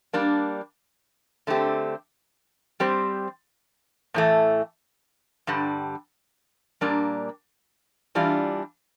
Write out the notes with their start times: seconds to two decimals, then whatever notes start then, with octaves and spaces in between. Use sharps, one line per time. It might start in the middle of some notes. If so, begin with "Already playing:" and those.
0.13 G3 A#3 D4
1.47 D3 A3 C4 G4
2.80 G3 C4 G4 C5
4.14 A2 E3 A3
5.47 G2 D3 G3
6.81 A#2 G3 A#3 D4
8.15 E3 G3 D4 F4